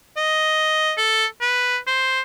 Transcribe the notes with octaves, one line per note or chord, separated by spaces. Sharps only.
D#5
A4
B4
C5